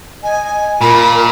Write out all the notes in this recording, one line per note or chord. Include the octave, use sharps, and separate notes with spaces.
D#5 G#5
A#2 F4 A#4 B5